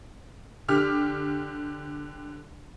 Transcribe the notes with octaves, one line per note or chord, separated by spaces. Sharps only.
D3 G4 F6